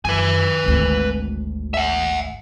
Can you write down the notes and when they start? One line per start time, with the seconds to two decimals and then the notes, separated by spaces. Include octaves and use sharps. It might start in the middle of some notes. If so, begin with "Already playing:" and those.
0.05 F#2 B4 G#5
0.64 G#1 D2
1.74 E5 F#5